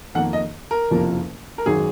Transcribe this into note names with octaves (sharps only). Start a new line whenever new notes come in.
F2 D#3 A#3 F#5
D#5
A#4
F#1 F2 C3 F3 A#3
A#4
G#1 F#2 D#3 F#3 G#4